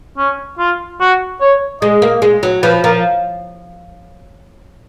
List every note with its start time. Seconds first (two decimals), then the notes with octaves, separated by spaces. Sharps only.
0.18 C#4
0.58 F4
1.00 F#4
1.41 C#5
1.82 G#3 D#5
2.02 A#3
2.22 G#3
2.43 F#3
2.63 F3 B4
2.84 F3 A#4